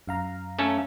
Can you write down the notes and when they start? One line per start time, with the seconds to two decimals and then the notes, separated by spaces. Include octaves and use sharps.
0.07 F#2 F5 A#5
0.59 A3 C#4 A4